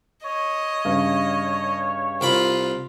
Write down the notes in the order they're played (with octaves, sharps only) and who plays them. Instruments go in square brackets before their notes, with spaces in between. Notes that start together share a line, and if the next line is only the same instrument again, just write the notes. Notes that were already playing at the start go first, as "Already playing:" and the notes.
[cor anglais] C#5 [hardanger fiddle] D#5
[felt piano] G2 C#3
[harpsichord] C2 A#4 B5 [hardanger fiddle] F4